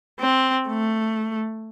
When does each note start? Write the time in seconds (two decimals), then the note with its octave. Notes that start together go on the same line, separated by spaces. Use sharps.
0.20 C4
0.68 A3